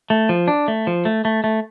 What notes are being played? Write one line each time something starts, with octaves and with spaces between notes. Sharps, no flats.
A3
F3
D4
A3
F3
A3
A3
A3